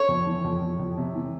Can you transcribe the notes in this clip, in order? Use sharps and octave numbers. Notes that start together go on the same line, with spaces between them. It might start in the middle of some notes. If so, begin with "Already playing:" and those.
Already playing: C#5
F2
E3
F2
F2
F2
C3
E3